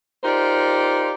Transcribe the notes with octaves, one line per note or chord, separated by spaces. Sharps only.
D#4 F4 G4 A#4 C5 D5